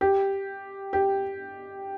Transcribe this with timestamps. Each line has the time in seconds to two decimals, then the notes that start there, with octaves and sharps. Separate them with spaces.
0.01 G4
0.93 G4